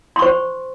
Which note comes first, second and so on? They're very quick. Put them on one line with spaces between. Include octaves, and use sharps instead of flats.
C6 C#6 C5